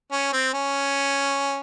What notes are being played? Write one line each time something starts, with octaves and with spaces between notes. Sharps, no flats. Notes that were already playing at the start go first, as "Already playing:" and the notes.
C#4
C4
C#4